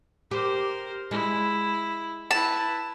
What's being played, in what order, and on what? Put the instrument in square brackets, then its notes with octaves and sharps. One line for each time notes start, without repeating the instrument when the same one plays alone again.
[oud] G4 [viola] A#4 C5
[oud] G#3 [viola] E4
[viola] E4 B4 [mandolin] A5